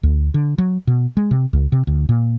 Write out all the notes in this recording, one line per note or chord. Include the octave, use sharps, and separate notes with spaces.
D2
D3
F#3
B2
G#3
C3
C#2
C3
D2
A#2